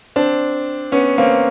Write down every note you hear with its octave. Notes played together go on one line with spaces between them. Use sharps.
C4 D4
B3 C#4
A#3 C4